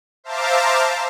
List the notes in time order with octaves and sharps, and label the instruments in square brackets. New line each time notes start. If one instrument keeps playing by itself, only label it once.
[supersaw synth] C5 E5 F5 A5 A#5 D6